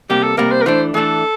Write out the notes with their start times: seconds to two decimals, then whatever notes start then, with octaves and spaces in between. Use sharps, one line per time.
0.10 C3 G3 A#3 G4
0.23 A4
0.37 C3 G3 A#3 A#4
0.51 C5
0.62 A#4
0.66 E3 A3 D4 C5
0.94 E3 A3 D4 A4